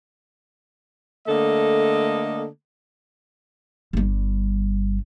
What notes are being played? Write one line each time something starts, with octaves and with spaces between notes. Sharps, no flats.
D3 A3 A#3 A4 D#5
G1 G3